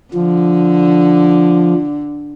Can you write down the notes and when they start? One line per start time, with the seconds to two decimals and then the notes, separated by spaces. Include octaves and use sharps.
0.14 D3 F3